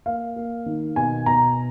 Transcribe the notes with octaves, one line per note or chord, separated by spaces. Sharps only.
A#3 F5
A#3
D#3
B2 G#5
B2 A#5